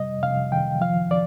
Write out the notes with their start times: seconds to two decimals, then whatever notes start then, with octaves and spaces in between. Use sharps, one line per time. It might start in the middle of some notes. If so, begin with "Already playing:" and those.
Already playing: C3 G3 D#5
0.22 C3 F5
0.52 D#3 G5
0.81 F3 F5
1.11 F3 D5